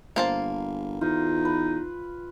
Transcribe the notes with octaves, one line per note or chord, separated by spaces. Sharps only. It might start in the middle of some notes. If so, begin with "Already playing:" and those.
G1 A#3 C5 A5
E2 D#4 F4
B4